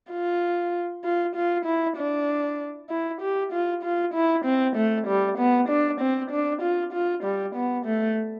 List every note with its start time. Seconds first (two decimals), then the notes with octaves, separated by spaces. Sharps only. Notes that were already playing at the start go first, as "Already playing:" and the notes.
0.11 F4
1.04 F4
1.35 F4
1.65 E4
1.96 D4
2.89 E4
3.21 G4
3.52 F4
3.83 F4
4.14 E4
4.45 C4
4.76 A3
5.07 G3
5.38 B3
5.69 D4
6.00 C4
6.31 D4
6.62 F4
6.93 F4
7.24 G3
7.55 B3
7.86 A3